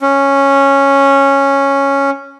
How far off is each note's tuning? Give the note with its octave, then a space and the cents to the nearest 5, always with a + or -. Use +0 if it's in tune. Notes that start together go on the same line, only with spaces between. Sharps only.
C#4 -5